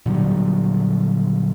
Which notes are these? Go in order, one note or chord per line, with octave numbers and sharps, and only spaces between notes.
A#2 D3 F#3 G3